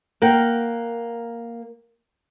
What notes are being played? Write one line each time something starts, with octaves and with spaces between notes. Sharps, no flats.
A#3 A#4 F#5 G5